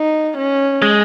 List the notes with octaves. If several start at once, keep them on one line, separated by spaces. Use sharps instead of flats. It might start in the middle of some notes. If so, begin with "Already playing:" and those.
Already playing: D#4
C#4
G#3